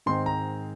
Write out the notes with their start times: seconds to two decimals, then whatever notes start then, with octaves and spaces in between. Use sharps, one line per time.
0.06 G#2 D#3 G#3 C4 C6
0.26 A#5